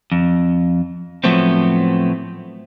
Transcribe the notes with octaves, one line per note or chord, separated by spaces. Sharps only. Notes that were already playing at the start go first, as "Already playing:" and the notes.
F2
A2 F3 F#3 A3 B3 C4